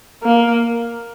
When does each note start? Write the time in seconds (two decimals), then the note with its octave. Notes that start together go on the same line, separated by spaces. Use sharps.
0.23 A#3